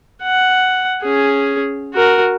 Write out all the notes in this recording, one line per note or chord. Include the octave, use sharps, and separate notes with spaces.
F#5
C#4 G#4
F#4 A#4